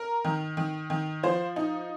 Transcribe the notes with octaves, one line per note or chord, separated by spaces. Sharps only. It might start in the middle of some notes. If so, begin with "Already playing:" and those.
Already playing: A#4
D#3
D#3
D#3
F3 C5
D#4